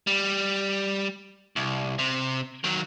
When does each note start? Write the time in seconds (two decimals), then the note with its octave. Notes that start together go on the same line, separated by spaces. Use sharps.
0.07 G3
1.56 C2
1.99 C3
2.64 D#3 F#3